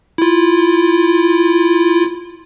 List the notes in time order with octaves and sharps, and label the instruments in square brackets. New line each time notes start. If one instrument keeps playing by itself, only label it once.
[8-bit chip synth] E4 F4